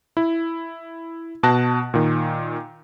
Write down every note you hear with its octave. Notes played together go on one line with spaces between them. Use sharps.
E4
B2 A5 F#6 A#6
A#2 D#3